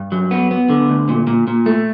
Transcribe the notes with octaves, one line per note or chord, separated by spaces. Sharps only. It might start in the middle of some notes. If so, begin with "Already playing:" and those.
Already playing: G2
F#3
B3
B3
D3
D2
A#2
A#2
A#2
A3